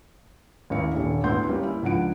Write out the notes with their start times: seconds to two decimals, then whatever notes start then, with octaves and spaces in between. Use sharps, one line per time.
0.70 A1 D#2 A#3 E4 A#4 C#7
0.92 D#1 D3
1.24 D2 A3 B3 E4 C6 G6
1.49 G3 A#3 C#4
1.63 E4
1.83 C#2 F3 D4 F#5 D7